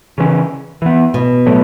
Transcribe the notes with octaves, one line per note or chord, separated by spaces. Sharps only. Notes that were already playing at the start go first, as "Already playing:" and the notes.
C#3 E3 C#4
E3 B3
B2
A2 F#3 A3